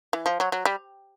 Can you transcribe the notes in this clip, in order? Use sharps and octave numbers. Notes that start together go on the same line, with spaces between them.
E3
F3
F#3
F#3
G3